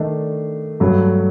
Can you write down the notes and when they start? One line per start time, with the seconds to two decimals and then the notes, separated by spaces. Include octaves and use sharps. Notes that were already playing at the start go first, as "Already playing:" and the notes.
Already playing: D#3 A3 D4
0.80 G2 F#3 A3